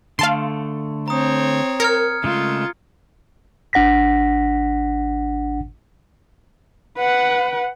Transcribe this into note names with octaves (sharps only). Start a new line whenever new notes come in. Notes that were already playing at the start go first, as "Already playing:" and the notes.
D3 A3 F5 A5 C6
C4 C#5 A#5 D#6
A#4 F6 G#6 C#7
C#3 G#3 A3 F4
G#1 D4 F#5 A#6 B6
B4 F#5